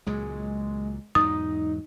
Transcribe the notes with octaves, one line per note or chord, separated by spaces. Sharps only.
C#2 A#2 F#3 G#3
E2 G#2 F#3 D#4 D#6